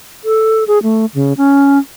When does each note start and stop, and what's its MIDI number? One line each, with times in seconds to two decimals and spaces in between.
0.24 0.64 69
0.68 0.79 68
0.83 1.06 57
1.14 1.33 49
1.37 1.79 61